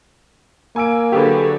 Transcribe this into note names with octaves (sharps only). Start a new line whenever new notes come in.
A#3 G#5 E6 D7
D3 F#3 G4 G#4 B4